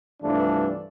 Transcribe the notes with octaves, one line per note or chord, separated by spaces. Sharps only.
C2 G2 E3 F3 A3 D4